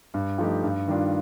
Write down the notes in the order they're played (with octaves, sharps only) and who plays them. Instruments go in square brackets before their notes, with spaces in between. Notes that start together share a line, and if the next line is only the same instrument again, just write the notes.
[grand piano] G2
F3 A3 D#4 G4
G2
D#3 G3 D4 F4